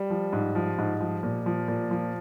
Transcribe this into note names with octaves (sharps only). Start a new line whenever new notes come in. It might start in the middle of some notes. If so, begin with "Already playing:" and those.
Already playing: G3
F3
G#2
F3
G#2
F3
A#2
F3
A#2
F3